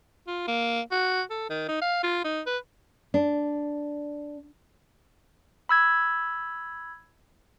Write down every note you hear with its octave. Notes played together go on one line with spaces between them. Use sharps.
F4
A#3
F#4
A4
D#3
D#4
F5
F4
D#4
B4
D4
B5 E6 G#6